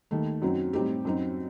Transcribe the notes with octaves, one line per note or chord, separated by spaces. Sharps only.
D#2 D#3 A3
F#2 F#3 C4 D#4
A2 G3 C4 D#4 G4
F#2 F#3 C4 D#4